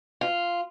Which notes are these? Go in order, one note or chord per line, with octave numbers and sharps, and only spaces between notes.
F4